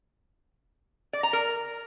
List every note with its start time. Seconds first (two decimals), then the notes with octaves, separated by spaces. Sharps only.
1.13 D5
1.23 A#5
1.33 A#4